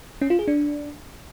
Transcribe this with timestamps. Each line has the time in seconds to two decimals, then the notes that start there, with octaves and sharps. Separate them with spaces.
0.22 C#4
0.30 F4
0.39 G#4
0.48 D4